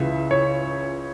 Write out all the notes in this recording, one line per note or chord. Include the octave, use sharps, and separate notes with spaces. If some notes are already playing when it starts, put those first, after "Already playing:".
Already playing: C#2 C#3 E3 E5
C#5